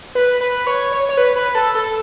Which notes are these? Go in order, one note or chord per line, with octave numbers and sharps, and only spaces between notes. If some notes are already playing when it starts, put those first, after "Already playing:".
B4
B4
C#5
C#5
C#5
B4
B4
A4
A4